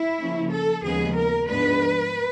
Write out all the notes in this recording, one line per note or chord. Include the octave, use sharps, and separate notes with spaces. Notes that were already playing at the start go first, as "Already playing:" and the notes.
Already playing: E4
C#3 F3 A#3 C#4
A4
D#2 C#3 F3 G#3 B3 G#4
A#4
G#2 F3 G#3 B3 D4 B4